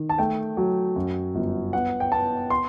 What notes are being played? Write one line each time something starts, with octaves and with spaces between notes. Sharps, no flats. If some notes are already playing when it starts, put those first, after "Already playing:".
Already playing: D#3
A5
A3 G5
F#3
F#2
G1
B3 F#5
G5
B3 A5
C6